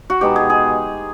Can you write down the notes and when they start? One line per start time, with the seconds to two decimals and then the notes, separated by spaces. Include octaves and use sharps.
0.10 F#4
0.21 B2 G#3 B3 D#4 G4
0.36 G#4
0.50 G#4